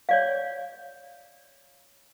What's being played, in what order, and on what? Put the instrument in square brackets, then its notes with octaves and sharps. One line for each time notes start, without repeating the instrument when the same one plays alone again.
[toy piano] C#5 D5 F5